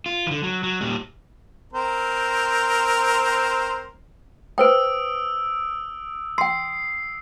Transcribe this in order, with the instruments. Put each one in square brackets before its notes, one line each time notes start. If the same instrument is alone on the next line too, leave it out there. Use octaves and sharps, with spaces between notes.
[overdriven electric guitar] F4
D3 E3
F#3
F#3
A#2 G3
[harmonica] C4 A#4 C5
[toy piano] B4 C5 G5 [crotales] D#6 E6 D7
[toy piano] G5 C6 [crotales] C7